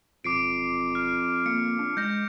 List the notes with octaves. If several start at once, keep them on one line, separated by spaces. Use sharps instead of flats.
E1 F2 D6 C7 D7
F6
A#3 C#7
D4
G#3 G6 A#6